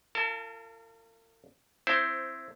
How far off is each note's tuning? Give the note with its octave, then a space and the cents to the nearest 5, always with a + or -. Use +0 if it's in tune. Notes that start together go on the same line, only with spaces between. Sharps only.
F4 -30 A#4 -45 A5 -5
C4 +10 E4 +15 C5 +0